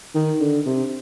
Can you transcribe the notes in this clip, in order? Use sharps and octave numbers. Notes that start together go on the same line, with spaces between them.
D#3
D3
C3